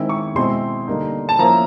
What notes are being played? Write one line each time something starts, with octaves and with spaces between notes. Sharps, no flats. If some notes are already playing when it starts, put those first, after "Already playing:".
Already playing: D#3 G#3 C4 E4
C#6
B2 G#3 C4 E4 C6
D3 G3 A#3 D#4
A5
F3 A#3 C#4 E4 A#5